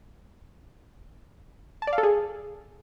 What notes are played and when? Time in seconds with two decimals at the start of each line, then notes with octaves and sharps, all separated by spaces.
1.82 A5
1.87 D5
1.93 F5
1.98 A4
2.03 G#4